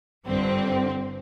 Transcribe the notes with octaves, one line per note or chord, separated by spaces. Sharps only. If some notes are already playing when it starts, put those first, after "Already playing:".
G1 G2 D3 C4